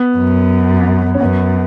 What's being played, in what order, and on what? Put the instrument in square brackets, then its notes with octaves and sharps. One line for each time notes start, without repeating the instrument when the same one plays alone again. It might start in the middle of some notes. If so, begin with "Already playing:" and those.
Already playing: [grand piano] B3
[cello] F#2
[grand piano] C#4
[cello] F#2 [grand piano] B3